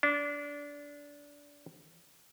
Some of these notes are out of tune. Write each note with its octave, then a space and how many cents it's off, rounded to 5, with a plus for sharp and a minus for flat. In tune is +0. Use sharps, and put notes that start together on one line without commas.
D4 -20